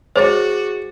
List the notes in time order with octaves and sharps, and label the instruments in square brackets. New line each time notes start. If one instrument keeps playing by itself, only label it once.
[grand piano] G#3 D6 A6 [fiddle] F#4 [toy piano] C5 [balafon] C#5